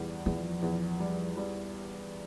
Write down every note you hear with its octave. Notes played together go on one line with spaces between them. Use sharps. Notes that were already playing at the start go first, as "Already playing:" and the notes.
Already playing: E2 G3
E2 F3
E2
G3
G3